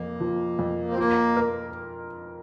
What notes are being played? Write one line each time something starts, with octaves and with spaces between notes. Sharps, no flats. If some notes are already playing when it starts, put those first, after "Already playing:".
Already playing: F2 A#3
F3
F2
C4
A#3 F4
A#4